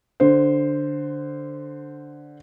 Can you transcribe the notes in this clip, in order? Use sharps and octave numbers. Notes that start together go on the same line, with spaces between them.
D3 C5